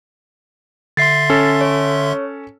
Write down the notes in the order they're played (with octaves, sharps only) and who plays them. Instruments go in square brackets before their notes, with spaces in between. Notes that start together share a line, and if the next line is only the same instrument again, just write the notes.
[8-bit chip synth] D3 E5 C6 [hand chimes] A6 C7
[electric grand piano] C#4 A4
[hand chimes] C#5